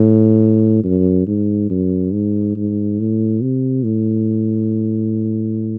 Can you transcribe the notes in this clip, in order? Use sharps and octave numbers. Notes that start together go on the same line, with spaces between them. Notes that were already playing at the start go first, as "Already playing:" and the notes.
Already playing: A2
F#2
G#2
F#2
G#2
G#2
A2
C3
A2